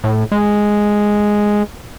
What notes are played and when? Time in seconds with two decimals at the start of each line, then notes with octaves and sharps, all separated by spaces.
0.04 A2
0.32 G#3